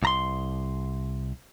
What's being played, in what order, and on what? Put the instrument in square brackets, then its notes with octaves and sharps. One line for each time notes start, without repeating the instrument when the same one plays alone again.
[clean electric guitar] C2 A#5 C6